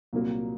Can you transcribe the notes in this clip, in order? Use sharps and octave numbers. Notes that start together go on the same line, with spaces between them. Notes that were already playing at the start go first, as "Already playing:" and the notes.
C2 A#2 F#3 A#3